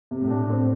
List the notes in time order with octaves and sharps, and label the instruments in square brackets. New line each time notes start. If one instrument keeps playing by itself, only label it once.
[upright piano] C3
[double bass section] A2
[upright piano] D4
C4